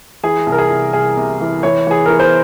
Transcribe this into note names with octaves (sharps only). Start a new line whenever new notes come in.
E3 G#4
C2
A#4
G#4
C2
C2 G#4
C3
E3
E3 C#5
E3 G#4
E3 A#4
C5